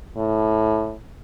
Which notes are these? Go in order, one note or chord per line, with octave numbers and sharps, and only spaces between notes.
A2